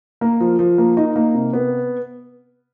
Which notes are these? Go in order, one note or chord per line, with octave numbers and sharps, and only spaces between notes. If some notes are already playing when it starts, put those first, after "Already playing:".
A#3
F3
F3
A#3
D#4
A#3
C3
B3